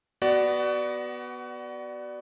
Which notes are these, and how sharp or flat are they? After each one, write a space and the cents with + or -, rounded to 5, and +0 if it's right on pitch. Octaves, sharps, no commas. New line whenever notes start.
B3 +0 F#4 +25 D5 +5